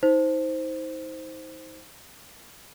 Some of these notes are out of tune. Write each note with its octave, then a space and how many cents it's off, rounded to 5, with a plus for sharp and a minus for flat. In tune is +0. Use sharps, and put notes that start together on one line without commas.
D#4 +35 C5 +0